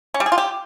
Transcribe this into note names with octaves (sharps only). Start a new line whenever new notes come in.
C#4
G3
G#4
F4
G4